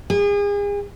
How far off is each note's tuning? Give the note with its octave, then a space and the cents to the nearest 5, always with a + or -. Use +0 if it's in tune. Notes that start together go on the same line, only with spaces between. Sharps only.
G#4 -35